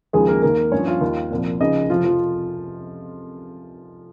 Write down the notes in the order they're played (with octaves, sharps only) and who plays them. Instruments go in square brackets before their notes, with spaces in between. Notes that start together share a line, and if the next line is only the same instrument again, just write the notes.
[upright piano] D#2 C#3 F3 G#3 G#4
A#3 A#4
D#2 D#3 A#3 A#4
G2 F3 C#4 C#5
F4 F5
D#2 D#3
C2 A#2 F3
C#2 C#3 F3 D#4 D#5
F2 C3 F3 F4
F3 F4